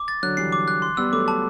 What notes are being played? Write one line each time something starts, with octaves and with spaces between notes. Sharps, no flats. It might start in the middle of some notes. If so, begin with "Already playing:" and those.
Already playing: D6
A6
D3 F#3 F#6
E3 G3 C7
D6
F#6
C6
G3 B3 E6
F#3 A3 D6
A5